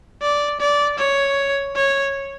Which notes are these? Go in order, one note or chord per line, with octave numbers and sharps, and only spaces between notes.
D5
D5
C#5
C#5